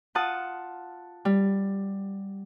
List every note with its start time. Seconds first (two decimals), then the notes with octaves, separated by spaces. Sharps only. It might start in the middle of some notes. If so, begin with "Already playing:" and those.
0.15 F4 F#5 A5 D#6
1.25 G3